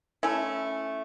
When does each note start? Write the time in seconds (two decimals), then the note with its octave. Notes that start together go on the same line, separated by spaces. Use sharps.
0.23 A3 C#4 E4